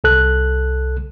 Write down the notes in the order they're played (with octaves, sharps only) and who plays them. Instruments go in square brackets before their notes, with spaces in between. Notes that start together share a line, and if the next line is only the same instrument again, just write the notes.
[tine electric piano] C2 A4 F#6